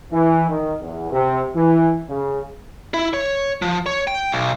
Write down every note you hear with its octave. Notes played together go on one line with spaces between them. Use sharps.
E3
D#3
E2
C3
E3
C#3
E4
C#5
F3
C#5
G5
B1